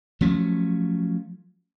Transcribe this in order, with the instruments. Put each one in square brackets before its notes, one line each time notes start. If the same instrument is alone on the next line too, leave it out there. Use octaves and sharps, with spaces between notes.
[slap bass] F3 F#3 A3 C#4